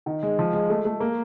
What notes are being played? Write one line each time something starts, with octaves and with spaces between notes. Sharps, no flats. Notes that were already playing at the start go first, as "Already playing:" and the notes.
D#3
G#3
F3
G#3
A3
A3
A#3